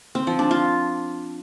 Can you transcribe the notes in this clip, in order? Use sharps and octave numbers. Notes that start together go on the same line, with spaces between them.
C4
F3
D4
F4